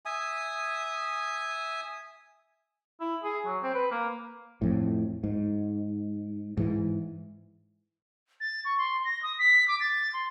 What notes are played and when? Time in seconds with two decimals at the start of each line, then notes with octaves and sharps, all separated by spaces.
0.06 E5 G#5 D#6
3.00 E4
3.23 G#4
3.45 F#3
3.63 C4
3.74 B4
3.91 A#3
4.62 F2 A2
5.24 G#2
6.57 G#2 E3
8.40 A6
8.64 C#6
8.78 C6
9.04 A#6
9.22 D#6
9.38 B6
9.68 D6
9.80 A6
10.13 C6